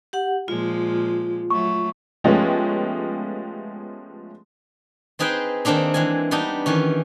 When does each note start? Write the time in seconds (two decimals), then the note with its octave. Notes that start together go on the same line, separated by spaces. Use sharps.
0.13 G4 F#5
0.48 A#2 F3 G#3 F4
1.51 F#3 A3 C#6
2.24 F3 G#3 A3 B3 C#4 G4
5.19 C4 D#4 G#4 B4 C5 G5
5.65 D#3 A#3 C4 D4 D#4
5.94 E3 G#3 G#5
6.31 G3 B3 D4 D#4
6.66 D#3 E3 C#4